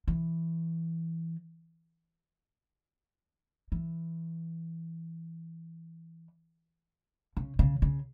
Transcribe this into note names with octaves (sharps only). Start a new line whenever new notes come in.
E3
E3
C#3
C#3
C#3